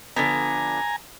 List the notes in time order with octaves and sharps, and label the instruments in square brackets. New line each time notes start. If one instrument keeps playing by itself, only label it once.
[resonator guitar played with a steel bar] D3 F3 B3 [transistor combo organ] G#5 A#5